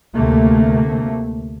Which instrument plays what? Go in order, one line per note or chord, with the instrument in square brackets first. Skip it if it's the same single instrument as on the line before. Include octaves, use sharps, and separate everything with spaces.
[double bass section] D2 C3 A3 A#3